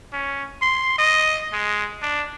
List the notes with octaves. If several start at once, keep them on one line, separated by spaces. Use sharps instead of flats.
C#4
C6
D#5
G#3
D4